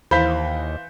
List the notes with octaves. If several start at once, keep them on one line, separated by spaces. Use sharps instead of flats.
D#2 E3 C5 F5 B5 G6 B6